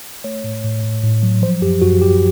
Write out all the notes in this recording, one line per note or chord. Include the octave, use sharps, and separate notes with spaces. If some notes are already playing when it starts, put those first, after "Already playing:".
A3 C#5
A2
A2
A2
A2
F#3
F3 C5
F#2 G4
F#2 F#4
F#2 G4